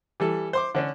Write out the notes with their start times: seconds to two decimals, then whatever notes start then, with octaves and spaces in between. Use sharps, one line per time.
0.20 E3 G3 A4
0.53 C5 C6 D6
0.75 D3 C#4 D4